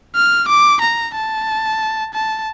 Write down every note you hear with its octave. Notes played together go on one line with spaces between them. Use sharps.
F6
D6
A#5
A5
A5